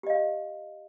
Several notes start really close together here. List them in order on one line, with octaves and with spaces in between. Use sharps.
G4 D#5 F5